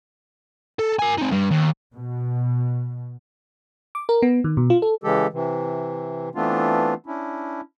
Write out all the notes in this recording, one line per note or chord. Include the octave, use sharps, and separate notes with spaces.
A4
A#4 G#5
C4 D#4
G2 G3
D#2
B2
D6
A#4
B3
D#3
B2
F4
A4
C#3 E3 G#3 G4 A4
C3 E3
E3 A3 B3 C4 D4 F4
C#4 D4 E4